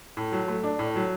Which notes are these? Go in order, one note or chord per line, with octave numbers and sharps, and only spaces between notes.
A2
F#3
A3
D4
A2
F#3